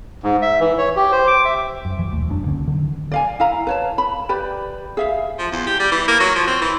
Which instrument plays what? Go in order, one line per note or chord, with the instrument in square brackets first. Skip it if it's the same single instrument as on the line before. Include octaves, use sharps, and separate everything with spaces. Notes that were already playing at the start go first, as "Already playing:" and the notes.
[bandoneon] G#2
E5
E3
C#5
G4
C5
D6
E5
[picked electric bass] F#2
E1 E3 F#3
A#1 D#2 A3
F#1 F#2 F#3 D4
C#2 D3 A#3 C#4
D1 D3 D#3 F#3
[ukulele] D5 F5 G#5
E4 F5 A#5
B4 C#5 A5
B5
G4 B4 D5 B5
G#4 E5 F5
[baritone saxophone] F3
E2
G4
G3
E3
A#3
F#3
F3
C4
E3